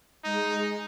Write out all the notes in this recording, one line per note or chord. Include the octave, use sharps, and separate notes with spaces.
G#3 D#4